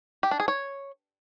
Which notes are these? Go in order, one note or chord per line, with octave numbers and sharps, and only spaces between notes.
G4
D4
G#4
C#5